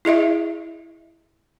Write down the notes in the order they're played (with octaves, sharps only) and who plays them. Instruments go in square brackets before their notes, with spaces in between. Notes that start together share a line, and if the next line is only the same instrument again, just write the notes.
[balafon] E4 G#4 D#5 E5